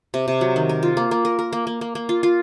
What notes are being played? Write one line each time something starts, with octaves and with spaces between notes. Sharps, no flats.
C3
C3
F#3
D#3
A#4
F4
A#3
A#3
A#4
A#4
A#3
A#3
A#3
A#3
F4
F4